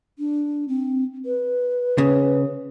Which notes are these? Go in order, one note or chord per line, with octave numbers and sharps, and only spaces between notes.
D4
C4
B4
C#3